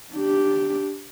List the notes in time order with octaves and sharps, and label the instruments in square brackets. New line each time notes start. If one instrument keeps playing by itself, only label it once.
[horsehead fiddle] D4 G4